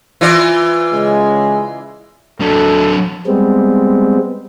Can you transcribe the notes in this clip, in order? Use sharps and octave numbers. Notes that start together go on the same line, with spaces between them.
E3 F4 D5
C#3 G#3
F#3 D4 A4
G3 G#3 B3 C4